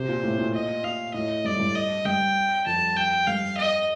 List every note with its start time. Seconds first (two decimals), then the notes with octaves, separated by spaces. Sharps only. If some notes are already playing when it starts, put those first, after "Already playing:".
Already playing: C3 C5
0.08 A#2
0.23 A2
0.39 A#2
0.54 D#5
0.84 A#2 F5
1.14 A2 D#5
1.45 G2 D5
1.52 A2
1.60 G2
1.75 D#5
2.05 G2 G5
2.66 F2 A5
2.97 G5
3.27 G2 F5
3.58 D#5